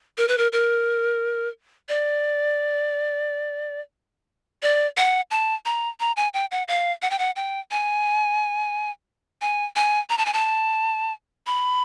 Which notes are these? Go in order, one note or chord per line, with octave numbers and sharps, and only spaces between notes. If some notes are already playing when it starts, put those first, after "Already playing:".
A#4
B4
A#4
A#4
D5
D5
F#5
A5
A#5
A#5
G#5
G5
F#5
F5
F#5
G5
F#5
G5
G#5
G#5
G#5
A#5
A5
G#5
A5
B5